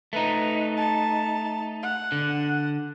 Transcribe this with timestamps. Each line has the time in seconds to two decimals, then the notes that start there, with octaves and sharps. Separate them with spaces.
0.13 A3 D#4 B4
0.77 A5
1.83 F#5
2.12 D3